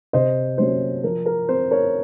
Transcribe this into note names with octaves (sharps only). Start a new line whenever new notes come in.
C3 C5 D#5
F#3 A#3 C#4 C5
F3 A#4
A#4
C4 C5
A#4 C#5